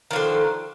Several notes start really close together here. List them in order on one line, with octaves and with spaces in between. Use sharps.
D#3 F3 D3